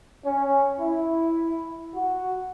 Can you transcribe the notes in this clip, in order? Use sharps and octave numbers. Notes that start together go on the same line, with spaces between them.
C#4
E4
F#4